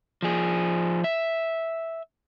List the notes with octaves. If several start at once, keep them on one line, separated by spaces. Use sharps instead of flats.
F3 G#4
E5